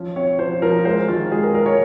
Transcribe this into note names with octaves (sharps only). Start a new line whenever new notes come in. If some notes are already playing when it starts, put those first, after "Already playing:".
Already playing: F3 C#4
C4 C#5
F3 C5
F3 A#4
G#3 C5
D#3 F4
G#3 G#4
A#4
G#3 A#4
C#5